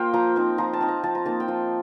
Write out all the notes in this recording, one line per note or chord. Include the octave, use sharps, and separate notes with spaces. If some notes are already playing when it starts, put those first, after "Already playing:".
Already playing: A#3 F4 A#4 C5 F5 G5
F3 A#5
C4 D#4
F3 A#5
A5
C4 D#4
A#5
F3 A5
A#5
A#3 D#4 A5
G5
F3 F5